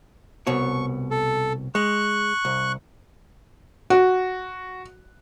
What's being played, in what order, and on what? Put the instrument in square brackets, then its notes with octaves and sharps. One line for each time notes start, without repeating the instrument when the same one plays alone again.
[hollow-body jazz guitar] C2 B2 C#5 [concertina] C#6
[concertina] A4
[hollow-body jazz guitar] G#3 [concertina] C#6 F#6
[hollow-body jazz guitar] C2
[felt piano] F#4